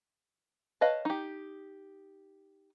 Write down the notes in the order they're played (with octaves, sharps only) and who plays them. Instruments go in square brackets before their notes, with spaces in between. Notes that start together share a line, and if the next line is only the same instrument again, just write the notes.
[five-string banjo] B4 C#5 D#5 F5 A5
D#4 G4